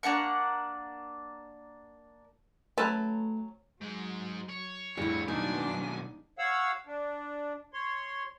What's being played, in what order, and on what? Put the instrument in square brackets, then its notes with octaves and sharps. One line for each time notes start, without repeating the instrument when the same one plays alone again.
[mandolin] A#3 D4 F#5 C#6
[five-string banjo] F#3 C#4 [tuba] A3 [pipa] B4 E5 A5
[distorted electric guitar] G#2 G#3 [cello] F#3
[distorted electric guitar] C#5
[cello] F2 A2 [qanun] G3 E4 [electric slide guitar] D4 G#4
[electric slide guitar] B2 D#3 F#3 [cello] A#3 D4 [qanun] D#4 [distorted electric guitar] G#5
[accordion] C#5 F5 F#5 E6
D4
C#5 C6